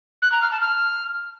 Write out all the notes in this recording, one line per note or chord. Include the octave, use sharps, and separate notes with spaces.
F#6
A#5
F6
A5
F6